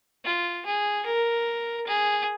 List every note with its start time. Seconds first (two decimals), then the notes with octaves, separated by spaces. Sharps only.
0.25 F4
0.66 G#4
1.06 A#4
1.87 G#4